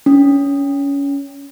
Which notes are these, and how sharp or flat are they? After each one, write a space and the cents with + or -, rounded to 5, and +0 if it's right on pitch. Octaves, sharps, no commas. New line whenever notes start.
C#4 +20